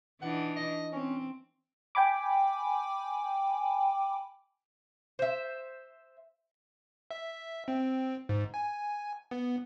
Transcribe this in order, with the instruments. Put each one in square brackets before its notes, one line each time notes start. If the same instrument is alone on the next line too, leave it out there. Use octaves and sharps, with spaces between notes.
[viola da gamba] E3 D4 D#4 [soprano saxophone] F#5
[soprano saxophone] D#5
[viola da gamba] C4 [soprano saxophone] C#4
[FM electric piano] G5 G#5 B5 D6
[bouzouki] C5 E5
[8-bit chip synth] E5
C4
G#2
G#5
B3